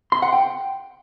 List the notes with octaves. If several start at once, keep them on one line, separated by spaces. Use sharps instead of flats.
C6
F#5
G5